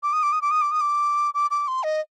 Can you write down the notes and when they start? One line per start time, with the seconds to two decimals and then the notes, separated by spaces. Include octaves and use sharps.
0.03 D6
0.13 D#6
0.23 D6
0.32 D#6
0.42 D6
0.51 D#6
0.61 D6
0.71 D#6
0.81 D6
1.34 D6
1.51 D6
1.68 C6
1.83 D#5